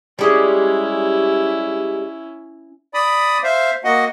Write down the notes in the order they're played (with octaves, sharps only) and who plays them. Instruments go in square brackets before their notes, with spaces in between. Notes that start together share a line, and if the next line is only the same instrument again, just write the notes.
[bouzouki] G3 G#3 [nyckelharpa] C#4 E4
[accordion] D5 B5 D#6
C5 E5 F5
A#3 F#4 D#5 F#5